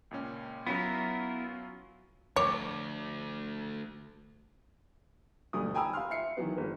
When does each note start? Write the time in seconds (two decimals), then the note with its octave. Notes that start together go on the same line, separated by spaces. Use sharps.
0.11 C#2 A#2 C#4
0.67 F#3 B3 C#4 E4 F4 A#4
2.36 D2 F3 C#5 D6
5.53 D2 G2 B2 D#6
5.74 G5 G#5 A#5 B5 D#6 E6
5.93 F5 B5 C6 F6
6.11 E5 C7 C#7
6.37 D#3 E3 F#3 B3
6.58 G1